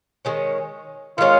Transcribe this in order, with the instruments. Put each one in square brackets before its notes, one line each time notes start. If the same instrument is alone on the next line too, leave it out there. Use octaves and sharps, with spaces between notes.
[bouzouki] D#3 G#3 C#4
[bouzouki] D#3 G#3 C#4 [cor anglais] F4